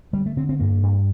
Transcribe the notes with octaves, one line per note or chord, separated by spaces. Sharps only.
D3 G3
A3
D3 C4
C4
G2 A#3
G2